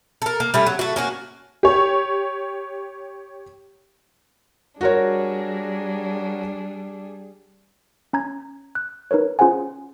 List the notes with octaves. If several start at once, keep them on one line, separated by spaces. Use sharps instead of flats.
A4 A#4
A#3
G3 A3 C#4
F#3
A3 F#4
A#3 C#4 F#4
G4 C#5
G3 D4 F#4 G#4 A#4 C#5
C#4 A#5 G#6
F#6
D#4 A#4 B4 C#5
C#4 F4 G#4 C5 F#5 G#5